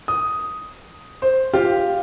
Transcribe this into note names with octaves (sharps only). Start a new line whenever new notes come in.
D#6
C5
F4 G4